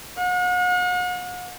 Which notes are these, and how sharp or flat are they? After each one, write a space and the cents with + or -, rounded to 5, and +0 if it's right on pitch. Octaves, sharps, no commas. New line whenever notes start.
F#5 -45